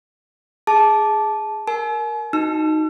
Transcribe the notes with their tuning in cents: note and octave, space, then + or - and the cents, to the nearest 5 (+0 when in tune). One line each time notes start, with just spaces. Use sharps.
G#4 +0 A5 -15 D6 +0
A#4 +0 G#5 +45
D#4 +0 F#4 +0 E6 +45